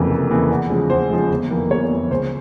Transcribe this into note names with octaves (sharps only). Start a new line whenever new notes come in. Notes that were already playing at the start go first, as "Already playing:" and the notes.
Already playing: F1 F2 C#3 E3 A#3
F1
F2 C#3 E3 A#3
E2
C#3 F3 G#3
E2 C5
C#3 F3 G#3
G1
F2 E3 A#3
G1 C#5
F2 E3 A#3
C#2 C5